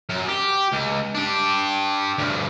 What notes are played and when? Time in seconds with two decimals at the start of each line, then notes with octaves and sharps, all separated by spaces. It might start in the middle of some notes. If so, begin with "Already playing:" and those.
0.09 F#2
0.29 G4
0.72 C#2
1.15 D4 G4
2.18 D2 G2